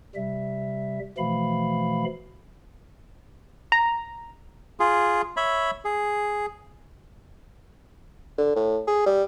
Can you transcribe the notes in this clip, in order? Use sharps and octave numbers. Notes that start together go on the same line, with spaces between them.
C3 G3 E5
B2 E3 F3 A3 F5 B5
A#5
F4 G#4
C#5 E5 B5
G#4
D3
A2
G#4
G3